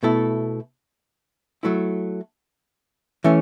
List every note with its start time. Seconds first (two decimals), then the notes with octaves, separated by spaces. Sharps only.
0.03 B2 A3 E4 A4
1.63 F#3 A3 E4
3.24 E3 A3 C#4